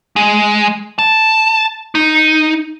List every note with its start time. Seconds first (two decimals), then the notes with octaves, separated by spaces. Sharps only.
0.16 G#3
0.99 A5
1.95 D#4